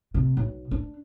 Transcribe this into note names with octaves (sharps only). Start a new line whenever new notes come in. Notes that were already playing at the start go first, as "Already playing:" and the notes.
C3
B1
D4